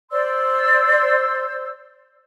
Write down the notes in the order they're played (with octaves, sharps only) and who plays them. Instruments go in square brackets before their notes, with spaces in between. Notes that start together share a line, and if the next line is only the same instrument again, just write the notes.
[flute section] C5 D5 C6 E6